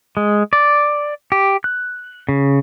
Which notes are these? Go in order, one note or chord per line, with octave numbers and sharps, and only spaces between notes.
G#3
D5
G4
F#6
C#3